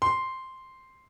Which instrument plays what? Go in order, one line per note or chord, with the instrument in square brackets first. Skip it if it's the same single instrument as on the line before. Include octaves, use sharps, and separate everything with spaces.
[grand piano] C6